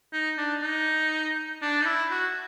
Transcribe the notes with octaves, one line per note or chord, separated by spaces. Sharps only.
D#4
D4
D#4
D4
D#4
E4
F#4